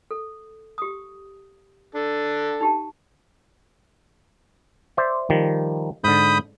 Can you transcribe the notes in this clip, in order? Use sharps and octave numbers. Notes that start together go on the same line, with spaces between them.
A4
G4 D#6
D4 A4
D#4 G4 A5
C5 D5 E5
D#3 F3 G3
G#2 D3 B5 D#6 G6